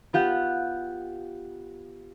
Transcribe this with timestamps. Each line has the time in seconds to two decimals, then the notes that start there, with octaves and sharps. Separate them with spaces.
0.13 B3 F4 G4 F#5